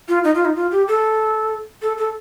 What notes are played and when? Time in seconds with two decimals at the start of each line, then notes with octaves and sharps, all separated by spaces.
0.08 F4
0.24 D#4
0.35 F4
0.45 D#4
0.56 F4
0.72 G4
0.88 A4
1.82 A4
1.98 A4